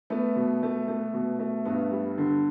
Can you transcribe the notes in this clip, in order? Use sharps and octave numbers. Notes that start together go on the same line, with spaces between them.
A3 B3
B2
A3
A3
B2
A3
G2 B3
G3
D3